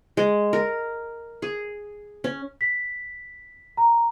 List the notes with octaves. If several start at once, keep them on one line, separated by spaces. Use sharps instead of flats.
G#3
A#4
G#4
C#4
B6
A#5